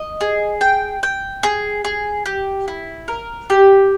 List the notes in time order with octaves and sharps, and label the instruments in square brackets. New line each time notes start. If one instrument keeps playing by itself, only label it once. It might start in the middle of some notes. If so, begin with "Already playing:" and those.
Already playing: [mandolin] D#5
G#4
G5
G5
G#4
G#4
G4
E4
A#4
G4